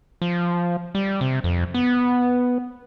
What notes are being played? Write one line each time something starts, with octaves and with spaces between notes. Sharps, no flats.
F3
G3
C3
F2
B3